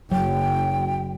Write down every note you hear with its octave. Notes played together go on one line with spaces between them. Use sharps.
F#1 F#3 G5